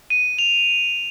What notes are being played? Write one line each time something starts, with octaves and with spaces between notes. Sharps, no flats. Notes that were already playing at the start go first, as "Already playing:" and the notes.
D#7
F7